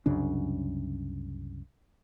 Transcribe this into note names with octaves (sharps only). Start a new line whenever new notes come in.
C2 F#2 C#3 D4